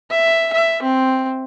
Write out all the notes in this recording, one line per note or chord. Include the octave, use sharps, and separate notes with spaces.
E5
E5
C4